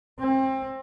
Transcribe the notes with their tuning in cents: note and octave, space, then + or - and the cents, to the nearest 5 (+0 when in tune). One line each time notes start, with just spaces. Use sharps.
C4 +25